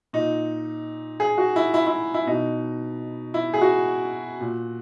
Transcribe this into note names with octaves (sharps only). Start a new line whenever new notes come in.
A#2 D#4
G#4
F#4
E4
E4
E4
E4
B2 D#4
E4
G#4
F#4
A#2